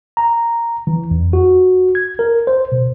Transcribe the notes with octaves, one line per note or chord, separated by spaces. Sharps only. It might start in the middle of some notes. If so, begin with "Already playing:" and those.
A#5
E3
F2
F#4
G#6
A#4
C5
B2